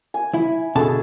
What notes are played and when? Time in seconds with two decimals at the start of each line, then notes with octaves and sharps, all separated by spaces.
0.14 G#5
0.34 E4
0.75 B2 D3 G#4 A4 E5 A5